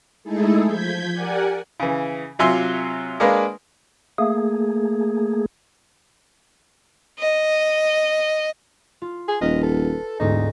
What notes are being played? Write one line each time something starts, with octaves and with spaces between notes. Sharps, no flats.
G#3 A3 D#4 E4 G#4 A4
F3 G6 G#6 B6
G4 A#4 D5 F#5 G#5
C#3 E3
C3 F#3 F4 E5 G#5 C6
G#3 A#3 D4 A#4 B4 F5
A3 A#3 G#4
D#5
F4
G#4
D#1 B4 D#5 F6
A4
E1 D2 G#2 D#4